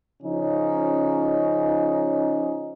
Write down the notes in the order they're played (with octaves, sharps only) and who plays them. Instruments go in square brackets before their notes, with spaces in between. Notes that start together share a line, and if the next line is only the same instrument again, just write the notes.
[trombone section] C#3 F3 C#4 D#4